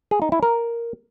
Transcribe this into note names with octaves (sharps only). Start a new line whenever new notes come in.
G#4
D#4
E4
A#4